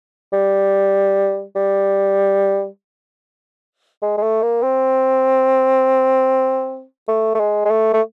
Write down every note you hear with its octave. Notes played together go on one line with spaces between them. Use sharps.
G3
G3
G#3
G#3
A3
A#3
C4
A3
A3
G#3
G#3
A3
A3